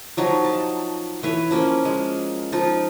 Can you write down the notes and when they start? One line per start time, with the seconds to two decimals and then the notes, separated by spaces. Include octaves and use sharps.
0.17 F3 F#3 D#4
0.45 A5
1.23 E3 B4 C#5
1.51 F3 A#3 C#4
1.85 G#3
2.53 F3 D#4 F4